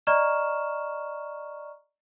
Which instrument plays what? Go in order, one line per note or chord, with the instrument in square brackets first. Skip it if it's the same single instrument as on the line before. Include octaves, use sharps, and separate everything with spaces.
[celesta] D5 D#5 A#5 C#6 F6 E7